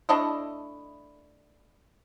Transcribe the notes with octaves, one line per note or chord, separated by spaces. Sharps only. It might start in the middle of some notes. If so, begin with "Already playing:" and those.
A3 D4 E4 D#5